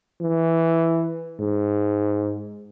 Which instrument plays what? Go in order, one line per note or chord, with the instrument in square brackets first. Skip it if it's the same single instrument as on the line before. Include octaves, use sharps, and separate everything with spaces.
[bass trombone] E3
G#2